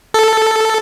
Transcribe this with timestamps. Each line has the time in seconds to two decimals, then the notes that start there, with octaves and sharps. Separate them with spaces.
0.14 A4